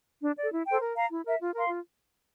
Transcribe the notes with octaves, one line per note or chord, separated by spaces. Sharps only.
D4
A4 D5
E4
A4 C5 G5
A#4
F5 A#5
E4
A#4 E5
F4
A#4 F5 C6
F4